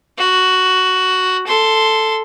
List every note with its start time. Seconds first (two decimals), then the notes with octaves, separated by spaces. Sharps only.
0.18 F#4
1.47 A4 C6